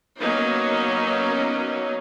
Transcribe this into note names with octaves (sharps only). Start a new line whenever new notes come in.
F#3 A#3 B3 C#4 D#4